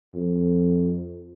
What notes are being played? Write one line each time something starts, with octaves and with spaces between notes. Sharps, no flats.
F2